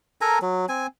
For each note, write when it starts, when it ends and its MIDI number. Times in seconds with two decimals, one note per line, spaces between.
0.21 0.39 69
0.21 0.39 70
0.21 0.39 80
0.21 0.39 82
0.42 0.66 54
0.69 0.87 60
0.69 0.87 80